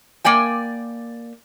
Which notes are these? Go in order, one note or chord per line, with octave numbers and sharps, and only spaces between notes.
A#3 D5 G5 G#5